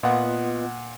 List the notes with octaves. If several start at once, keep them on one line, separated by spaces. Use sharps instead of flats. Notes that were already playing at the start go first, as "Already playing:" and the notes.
A#2 B3 F4 D#5 F#5